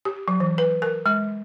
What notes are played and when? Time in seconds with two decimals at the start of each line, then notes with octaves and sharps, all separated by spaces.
0.05 G4
0.28 F#3
0.40 E3
0.58 B4
0.82 A#4
1.06 G#3